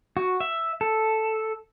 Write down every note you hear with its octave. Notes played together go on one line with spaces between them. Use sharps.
F#4
E5
A4